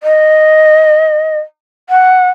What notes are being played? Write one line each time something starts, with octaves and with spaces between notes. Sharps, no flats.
D#5
F#5